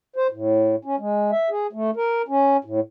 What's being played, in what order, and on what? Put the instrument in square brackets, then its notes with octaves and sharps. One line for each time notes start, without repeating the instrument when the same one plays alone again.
[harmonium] C5
A2
C#4
G#3
E5
G#4
A3
A#4
C#4
A2